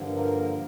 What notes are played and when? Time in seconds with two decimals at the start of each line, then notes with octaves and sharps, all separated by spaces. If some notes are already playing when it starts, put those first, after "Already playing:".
Already playing: G2 D3 F3 A#3
0.16 A#4